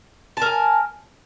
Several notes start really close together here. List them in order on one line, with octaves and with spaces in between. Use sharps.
A5 A#4 G#5